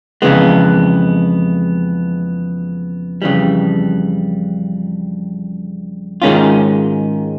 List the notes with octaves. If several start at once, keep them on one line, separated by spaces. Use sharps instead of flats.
F2 C#3 E3 G#3 B3
F2 C#3 E3 G3
G#2 D#3 G#3 C#4 F4